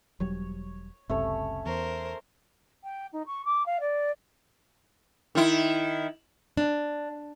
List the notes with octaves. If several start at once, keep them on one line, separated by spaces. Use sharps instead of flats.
E1 F#3 G3 C#5
F#1 C#2 C3 A3 C#4 C#5
E2 A#4 C5
G5
D#4
C#6
D6
F5
D5
D#3 E4
D4